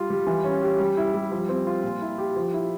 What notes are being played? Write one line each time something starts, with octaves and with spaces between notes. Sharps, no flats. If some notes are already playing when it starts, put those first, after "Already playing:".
Already playing: G3 F4
G3
E3
C#4
G4
G3
E4
G3
F3
C4
F4
A#2
E4
G4
F3
E4